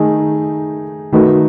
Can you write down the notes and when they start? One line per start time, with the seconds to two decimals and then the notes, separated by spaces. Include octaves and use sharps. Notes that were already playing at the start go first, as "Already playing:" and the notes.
Already playing: D#3 A3 D#4 G#4
1.13 D#3 A3 D#4 F#4 B4